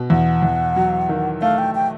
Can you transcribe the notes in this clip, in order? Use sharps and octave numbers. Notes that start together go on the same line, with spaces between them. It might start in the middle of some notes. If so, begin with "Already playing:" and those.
Already playing: B2
E2 F#5
E2
F#3
D#3
A3 F5
G5
G5